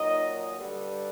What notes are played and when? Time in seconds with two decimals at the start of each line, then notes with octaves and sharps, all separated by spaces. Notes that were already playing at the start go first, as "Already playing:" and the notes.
Already playing: A#2 F#3 D#4 D#5
0.55 G2 D3 G3